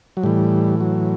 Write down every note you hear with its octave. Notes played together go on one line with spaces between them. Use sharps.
F#3
A2 E3 G3
F#3